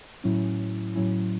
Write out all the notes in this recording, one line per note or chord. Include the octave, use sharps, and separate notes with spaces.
A2 F#3 C#4 E4
A2 F#3 C#4 E4